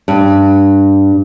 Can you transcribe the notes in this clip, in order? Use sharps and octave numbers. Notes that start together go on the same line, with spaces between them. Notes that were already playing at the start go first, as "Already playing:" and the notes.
G2